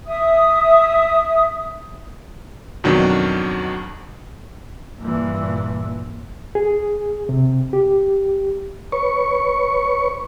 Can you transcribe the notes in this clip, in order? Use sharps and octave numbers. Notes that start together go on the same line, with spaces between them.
E5 D#6
F2 G#2 B2 D#3 F#3 D4
G2 A#2 E3
G#4
C3
G4
B4 C#5 C#6